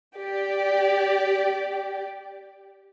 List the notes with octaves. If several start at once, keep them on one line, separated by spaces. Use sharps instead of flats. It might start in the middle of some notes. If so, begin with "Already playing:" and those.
G4 D5